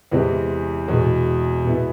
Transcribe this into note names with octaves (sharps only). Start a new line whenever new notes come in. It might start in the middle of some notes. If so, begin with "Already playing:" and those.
E2 C3 E3 G#3 C4
E2 B2 G#3
B2 G#3 B3 E4